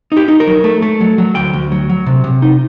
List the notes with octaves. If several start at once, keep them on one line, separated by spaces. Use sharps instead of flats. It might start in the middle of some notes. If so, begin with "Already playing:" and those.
D#4 G4
D#4
A#4
F#3
A3
A3
F#3
F#3
D2 G5
D2
F#3
F#3
C3
C3
D#4